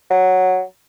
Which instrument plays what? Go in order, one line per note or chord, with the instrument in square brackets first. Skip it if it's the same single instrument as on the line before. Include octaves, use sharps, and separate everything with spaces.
[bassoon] F#3